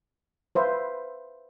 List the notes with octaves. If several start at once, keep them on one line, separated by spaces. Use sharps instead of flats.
B4 C5 E5 F5